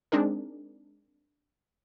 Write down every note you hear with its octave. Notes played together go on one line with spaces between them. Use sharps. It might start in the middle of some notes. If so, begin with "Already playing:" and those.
G#3 C4 D4 D#4 G#4 A#4